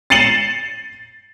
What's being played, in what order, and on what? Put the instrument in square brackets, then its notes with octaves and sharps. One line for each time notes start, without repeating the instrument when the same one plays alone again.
[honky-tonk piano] A6 C7 C#7 D#7 E7 F#7